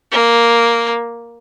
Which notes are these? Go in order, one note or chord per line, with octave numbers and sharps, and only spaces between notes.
A#3